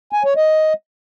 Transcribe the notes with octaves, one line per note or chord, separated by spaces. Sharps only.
G#5
C#5
D#5